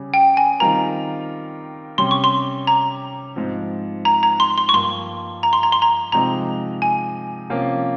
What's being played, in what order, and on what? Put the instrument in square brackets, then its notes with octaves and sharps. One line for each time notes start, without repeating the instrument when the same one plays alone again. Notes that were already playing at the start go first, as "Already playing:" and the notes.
Already playing: [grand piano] C#3 G3 C#4 G#4
[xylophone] G5
G#5
[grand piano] D#3 G3 C4 F4 A#4 [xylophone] A#5
[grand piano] C3 G3 C#4 [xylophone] C6
[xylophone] C#6
C6
A#5
[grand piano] G#2 F3 C4
[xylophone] A#5
A#5
C6
C6
C#6
[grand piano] G2 F3 A#3 [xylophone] C6
[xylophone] A#5
C6
A#5
C6
A#5
[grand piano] C3 F3 G#3 C4 D#4 [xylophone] A#5
[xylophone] G#5
[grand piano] C3 F3 A#3 C#4 F4